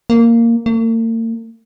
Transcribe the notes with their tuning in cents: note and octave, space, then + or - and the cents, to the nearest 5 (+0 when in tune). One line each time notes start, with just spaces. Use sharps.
A#3 -10
A#3 -45